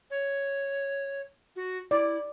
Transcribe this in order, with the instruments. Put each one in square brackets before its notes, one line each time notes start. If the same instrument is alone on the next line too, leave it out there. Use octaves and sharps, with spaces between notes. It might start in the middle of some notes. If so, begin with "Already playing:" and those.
[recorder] C#5
F#4
[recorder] E4 [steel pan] D5